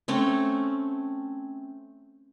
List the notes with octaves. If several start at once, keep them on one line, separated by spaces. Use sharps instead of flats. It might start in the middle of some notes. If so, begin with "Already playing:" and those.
A3 C4 C#4